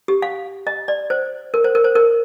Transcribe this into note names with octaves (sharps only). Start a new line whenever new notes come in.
G4
F5
D#5
D5
C5
A#4
C5
A#4
C5
A#4